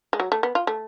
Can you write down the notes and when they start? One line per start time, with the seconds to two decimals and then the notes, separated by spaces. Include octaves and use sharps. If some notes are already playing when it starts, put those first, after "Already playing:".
0.13 G#3
0.20 F#3
0.32 A3
0.43 B3
0.55 F4
0.67 A3